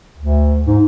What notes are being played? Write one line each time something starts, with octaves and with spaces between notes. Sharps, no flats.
D2
G#2